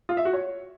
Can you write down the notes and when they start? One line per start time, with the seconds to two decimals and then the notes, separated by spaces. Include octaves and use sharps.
0.09 F4
0.17 E5
0.25 F#4
0.33 C#5